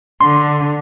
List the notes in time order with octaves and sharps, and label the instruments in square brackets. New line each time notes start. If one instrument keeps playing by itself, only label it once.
[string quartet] D3 [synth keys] C6